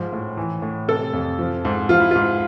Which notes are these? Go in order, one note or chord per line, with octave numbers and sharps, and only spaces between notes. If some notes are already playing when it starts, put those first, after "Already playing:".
Already playing: G#2 F3
A2
E3
A2
C3 A4
F2
F3
G#2
F3 F4
E4
G#2 F4